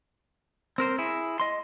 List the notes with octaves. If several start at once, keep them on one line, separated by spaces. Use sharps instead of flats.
C4 A#4 C5
E4 G#4
D#5 C6